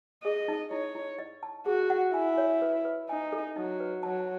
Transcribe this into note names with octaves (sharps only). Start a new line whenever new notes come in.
G#4 D#5
D#4
E4 C#5
E4
D#5
A5
F#4 G#4
F#5
E4 G#5
C#5
B4
B4
D#4 G#5
A4
F#3 D#4
B4
F#3 A5